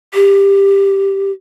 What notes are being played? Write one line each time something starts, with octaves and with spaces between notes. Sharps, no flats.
G4